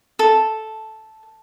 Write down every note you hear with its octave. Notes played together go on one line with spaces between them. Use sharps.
A4